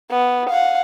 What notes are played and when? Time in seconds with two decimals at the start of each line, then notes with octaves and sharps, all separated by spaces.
0.11 B3
0.50 F5 F#5